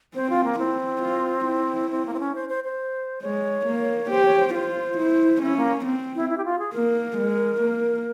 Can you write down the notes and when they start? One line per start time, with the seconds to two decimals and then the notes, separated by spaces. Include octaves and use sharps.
0.15 C4 C5
0.30 F4
0.44 A#3
0.59 C4 E4
1.03 F4
1.48 E4
1.91 C4
2.06 A#3
2.14 C4
2.20 C#4
2.35 C5
2.49 C5
2.64 C5
3.22 G#3 C#5
3.67 A#3
4.11 G4 C5
4.25 C#5
4.39 C5
4.54 F4 C5
4.98 E4
5.42 C#4 E4
5.57 A#3
5.86 C4
6.15 E4
6.29 E4
6.38 G4
6.45 F4
6.59 G#4
6.74 A#3 A#4
7.18 G#3
7.62 A#3